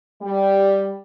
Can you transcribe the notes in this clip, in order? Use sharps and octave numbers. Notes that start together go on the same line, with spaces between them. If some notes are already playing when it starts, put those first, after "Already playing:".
G3